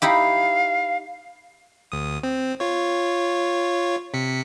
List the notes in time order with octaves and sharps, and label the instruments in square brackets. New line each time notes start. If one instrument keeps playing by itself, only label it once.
[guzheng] D#4 E4 G4 [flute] F5
[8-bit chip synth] D2 D#6
C4
F4 C#5
C3 B6 C#7